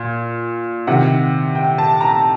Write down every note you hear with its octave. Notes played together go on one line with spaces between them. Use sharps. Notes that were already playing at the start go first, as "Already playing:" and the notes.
Already playing: A#2
C3 D#3 F#5
G5
A5
A#5